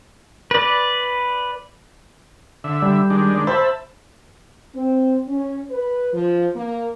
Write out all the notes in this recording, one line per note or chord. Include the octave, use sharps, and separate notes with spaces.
B4 D5
D3 E5
G3
D#3 G#3 D4
C5 E5 A5 B5
C4
C#4
B4
F3
A#3